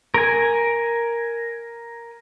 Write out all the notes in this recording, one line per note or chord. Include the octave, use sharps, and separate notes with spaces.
A#4 G#5